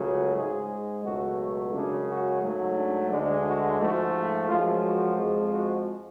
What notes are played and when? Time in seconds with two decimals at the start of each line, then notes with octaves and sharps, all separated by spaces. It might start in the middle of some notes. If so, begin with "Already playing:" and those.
Already playing: C#2 C#3 F#3 A3
0.35 G#2 G#3 G#4
1.04 C#2 B2 F#3 A3 F#4
1.73 F#2 C#3 G#3 D4
2.07 F#4
2.42 G#2 F#3 A3
2.76 D4
3.11 D2 D3 G#3 D4
3.45 F#4
3.79 G#2 F3 A3 F#4
4.48 F#2 F3 G#3 F4
4.83 F#4
5.16 F2 F3 G#3
5.51 F#4